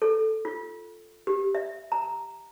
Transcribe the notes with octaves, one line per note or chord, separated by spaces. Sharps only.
A4
F4
G4
E5
A#5